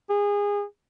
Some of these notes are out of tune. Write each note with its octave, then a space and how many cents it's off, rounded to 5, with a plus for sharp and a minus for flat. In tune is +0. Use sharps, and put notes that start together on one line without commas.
G#4 -25